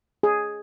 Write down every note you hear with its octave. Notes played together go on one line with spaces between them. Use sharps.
G#4